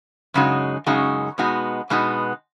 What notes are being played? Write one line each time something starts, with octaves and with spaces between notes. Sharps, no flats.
F#2 C#3 G#3 D#4 F#4
F#2 C#3 G#3 D#4 F#4
B2 G#3 B3 D#4 F#4
B2 G#3 B3 D#4 F#4